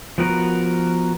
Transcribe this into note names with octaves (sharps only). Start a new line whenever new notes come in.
F3 B3 F#4 A#4 B4